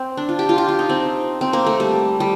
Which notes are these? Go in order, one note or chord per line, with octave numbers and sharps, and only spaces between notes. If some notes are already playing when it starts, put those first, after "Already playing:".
Already playing: C4
D4
F4
G4
F4
G4
F4
D#4
C4
C4
A#3
A3
G3
G3